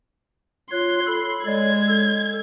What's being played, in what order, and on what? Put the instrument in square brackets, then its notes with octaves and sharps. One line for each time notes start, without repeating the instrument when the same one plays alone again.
[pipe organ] F4 C#5 F#6 [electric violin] C6
[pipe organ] A4 B5
[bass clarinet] G#3 [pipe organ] C#5 D5 [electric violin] G#6
[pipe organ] A4